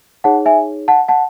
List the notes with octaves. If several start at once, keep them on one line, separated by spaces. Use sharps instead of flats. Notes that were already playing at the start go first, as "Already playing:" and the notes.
D#4 G#4 C#5 F#5 A5
E5 G#5
F#5 A5
F#5 A5